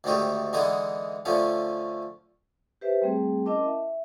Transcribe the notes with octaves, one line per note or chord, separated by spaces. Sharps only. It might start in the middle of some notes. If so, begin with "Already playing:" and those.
D2 G#2 D#3 A3 D#4 G4
D3 E3 G#3 B3 D#4 C6
D3 F3 A3 C#4
G4 B4 C5 E5
G3 A3 C4 G#4
C#4 E4 A#4 D#5 A5 D6
E5